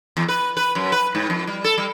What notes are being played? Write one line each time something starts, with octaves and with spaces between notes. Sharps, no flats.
E2
B4
B4
F#2
B4
G#2
F2
G3
A4
G3